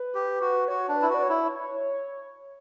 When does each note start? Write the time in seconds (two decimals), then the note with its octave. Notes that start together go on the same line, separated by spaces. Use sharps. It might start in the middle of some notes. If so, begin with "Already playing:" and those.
Already playing: B4
0.15 G4
0.41 F#4
0.63 B4
0.68 F#4 C#5
0.88 D4
0.95 B4
1.02 E4
1.10 F#4 D5
1.23 C#5
1.29 E4